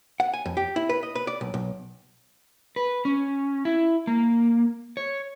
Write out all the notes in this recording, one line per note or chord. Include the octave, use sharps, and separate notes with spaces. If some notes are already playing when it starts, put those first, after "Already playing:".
F#5
G#5
F2
G4
E4
B4
D#5
B4
D5
B1
B1
B4
C#4
E4
A#3
C#5